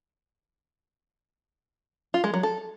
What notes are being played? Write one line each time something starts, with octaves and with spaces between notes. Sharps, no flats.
F4
G#3
F#3
A4